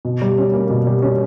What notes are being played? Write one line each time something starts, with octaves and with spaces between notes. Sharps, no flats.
B2
G3
C#4
A#3
B2
G3
C#4